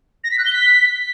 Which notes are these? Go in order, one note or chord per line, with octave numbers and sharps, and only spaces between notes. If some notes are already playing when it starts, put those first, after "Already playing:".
A#6
B6
F#6
G7
B6